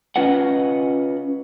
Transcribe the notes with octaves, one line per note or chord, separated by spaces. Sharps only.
C#4 F4 B4 D#5 F#5